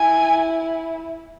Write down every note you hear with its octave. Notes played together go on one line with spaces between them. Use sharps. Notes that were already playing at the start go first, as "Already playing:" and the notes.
Already playing: E4 G#5